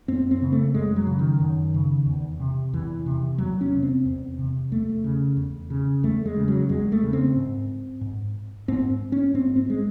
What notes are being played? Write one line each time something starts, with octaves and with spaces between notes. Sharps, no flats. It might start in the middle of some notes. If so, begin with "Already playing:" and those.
F#2 C4
C4
C#3
A3
F#2 G#3
F#3
C#3
D#3
F#2
C#3
E2
C3
E2 E3
C3
E2 F#3
C#4
C3
C4
E2
C3
E2 A3
C#3
E2
C#3
E2 A3
G#3
C#3
F#3
E2 G#3
A3
C#3
C4
G#2
G#2
G#2 C4
C#4
G#2 C4
C4
G#3